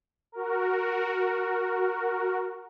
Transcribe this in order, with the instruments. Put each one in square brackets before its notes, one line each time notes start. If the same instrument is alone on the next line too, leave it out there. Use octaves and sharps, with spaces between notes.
[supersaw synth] F#4 A#4